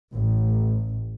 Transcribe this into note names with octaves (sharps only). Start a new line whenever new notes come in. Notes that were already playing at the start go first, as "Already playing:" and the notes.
A1